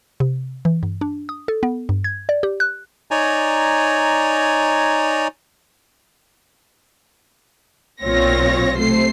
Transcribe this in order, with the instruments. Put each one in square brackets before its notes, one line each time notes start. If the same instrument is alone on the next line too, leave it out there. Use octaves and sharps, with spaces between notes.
[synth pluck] C3
E3
G2
D4
D#6
A4
B3
G2
G#6
D5
G4
F#6
[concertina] D#4 C#5 D5 G#5 A#5
[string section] B1 A#2 C4 F4 C#5 A#6
C3 A3 C5 C7